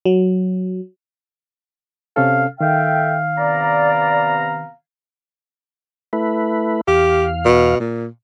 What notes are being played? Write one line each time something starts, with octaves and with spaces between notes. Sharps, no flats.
F#3
C3 C#4 A4 F5
D#3 A4 E5 F5 G5
C3 B3 D5 A#5
A3 E4 B4
E2 G4 F5
B2
A#2